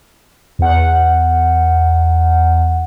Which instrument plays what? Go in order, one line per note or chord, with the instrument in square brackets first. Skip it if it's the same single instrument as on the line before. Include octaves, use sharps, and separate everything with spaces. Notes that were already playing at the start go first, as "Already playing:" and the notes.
[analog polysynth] E2 F#5